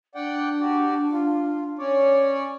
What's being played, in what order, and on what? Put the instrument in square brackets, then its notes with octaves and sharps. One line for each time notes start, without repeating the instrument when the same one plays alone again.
[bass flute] D4 [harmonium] D5 F#5 G5
[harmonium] F#4 G4 D5
F4
C#4 C#5 D5